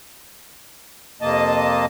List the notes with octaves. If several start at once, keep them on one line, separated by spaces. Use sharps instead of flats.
F2 C3 A#3 D#5 A5